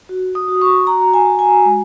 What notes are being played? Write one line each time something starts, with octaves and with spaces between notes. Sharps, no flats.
F#4
D#6
F#4
C#6
F#4 A#5
G#5
F#4
G#5
G#3